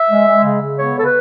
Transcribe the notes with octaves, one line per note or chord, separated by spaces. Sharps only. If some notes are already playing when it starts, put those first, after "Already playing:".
Already playing: E5
G#3
G#3
C#3
C#3
B3 C#5
C#3 A4
B4